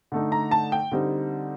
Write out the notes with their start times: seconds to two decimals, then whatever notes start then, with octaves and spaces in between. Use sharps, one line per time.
0.12 D3 A3 D#4
0.32 A#5
0.51 A5
0.72 G5
0.91 D3 G3 C4 D#4